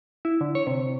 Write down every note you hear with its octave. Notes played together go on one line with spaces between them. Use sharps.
E4
D3
C#5
C3